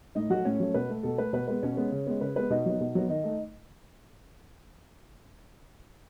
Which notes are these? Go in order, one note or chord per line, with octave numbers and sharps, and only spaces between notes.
A2 D#4 D#5
F#3 A3 F#4 F#5
A2 C#4 C#5
F#3 A3
B2 B4
A3
B2 A4
A3 B4
B2 B4
G#3 B3 B4
B2 C#4 C#5
G#3 B3
C#3
G#3 B3
C#3 B4
G#3 B3 B4
B2 D#4 D#5
F#3 B3
B2
F#3 B3
D#3 D#4 D#5
A3